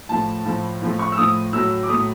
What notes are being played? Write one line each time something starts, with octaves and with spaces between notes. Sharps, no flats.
A2 F3 A3 A5
A2 F3 A3
A2 F3 A3
C#6
E6
A2 F3 A3 D#6
A2 F#3 A3 E6
D6
A2 F#3 A3 D#6